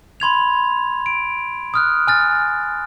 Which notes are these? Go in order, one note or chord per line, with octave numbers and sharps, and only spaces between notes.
B5 C6 G#6 F7
D7
D#6 F6 F#6
G#5 F6 A6